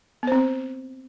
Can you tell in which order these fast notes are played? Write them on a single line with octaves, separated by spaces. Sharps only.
B3 C5 C4